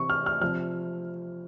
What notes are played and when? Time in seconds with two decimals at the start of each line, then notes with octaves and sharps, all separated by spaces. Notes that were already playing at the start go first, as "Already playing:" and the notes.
Already playing: C3 E3 C#6
0.10 F6
0.26 F6
0.41 C3 F3 F6